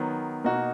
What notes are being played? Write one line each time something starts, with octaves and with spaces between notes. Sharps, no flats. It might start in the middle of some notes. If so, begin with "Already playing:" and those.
Already playing: D#3 F#3 B3
B2 A#3 D#4 F#4